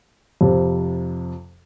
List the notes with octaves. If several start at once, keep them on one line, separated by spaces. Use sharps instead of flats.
F2 C3